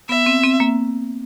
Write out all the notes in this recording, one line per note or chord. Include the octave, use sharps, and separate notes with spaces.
B3 E5
C4
C4
A#3